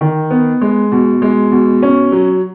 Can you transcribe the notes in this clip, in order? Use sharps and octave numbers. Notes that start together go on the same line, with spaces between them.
D#3
B3
G#3
B2
G#3
B2
C#4
F#3